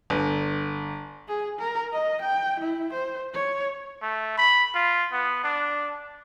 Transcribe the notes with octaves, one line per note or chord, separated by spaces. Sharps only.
G1
G#4
A#4
D#5
G5
E4
C5
C#5
A3
B5
F4
B3
D4